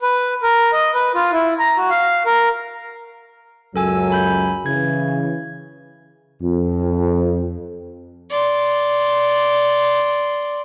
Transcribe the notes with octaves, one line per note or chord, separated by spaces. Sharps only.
B4
A#4
D#5
B4
F4
E4
A#5
F#4
F5
A#4
C#2 F#2 F#3 A4 G#5 E6
G#5 B5 G6
C#3 E3 G#6
F2
D5 C6